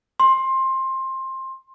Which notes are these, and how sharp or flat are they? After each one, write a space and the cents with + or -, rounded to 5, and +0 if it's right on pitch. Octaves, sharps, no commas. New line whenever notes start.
C6 +20